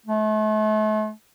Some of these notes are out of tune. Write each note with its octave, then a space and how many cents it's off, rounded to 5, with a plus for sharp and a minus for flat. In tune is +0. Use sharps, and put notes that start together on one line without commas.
A3 -40